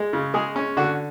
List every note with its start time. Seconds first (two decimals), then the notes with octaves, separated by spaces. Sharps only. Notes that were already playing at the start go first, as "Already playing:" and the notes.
Already playing: G#3
0.13 C#3
0.34 G#3 G#4
0.56 C#4
0.77 D3 F#4